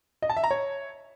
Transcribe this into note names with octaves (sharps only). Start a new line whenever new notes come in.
D#5
A5
E5
A#5
C#5